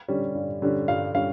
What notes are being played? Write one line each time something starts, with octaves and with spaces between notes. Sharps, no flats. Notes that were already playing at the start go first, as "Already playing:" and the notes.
D3 G3 C#4
G2
D3 G3 C#4
G2 F5
D3 G3 C#4 F5